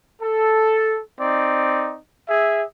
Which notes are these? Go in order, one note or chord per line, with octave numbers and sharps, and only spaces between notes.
A4
C4 D#4 D5
G#4 E5